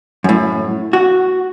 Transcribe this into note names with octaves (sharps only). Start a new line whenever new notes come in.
F#2 A2
F#4